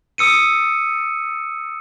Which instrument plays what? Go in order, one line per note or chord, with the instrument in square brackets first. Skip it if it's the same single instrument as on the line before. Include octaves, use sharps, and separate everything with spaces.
[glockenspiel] D#6 E6 C#7 D#7